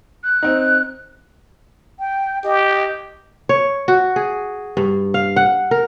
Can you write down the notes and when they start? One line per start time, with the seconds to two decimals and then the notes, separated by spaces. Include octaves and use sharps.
0.24 F#6
0.43 C4 D#4
2.00 G5
2.44 G4 D#5
3.49 C#5
3.88 F#4
4.16 G#4
4.77 G2
5.14 F5
5.36 F#5
5.71 A#4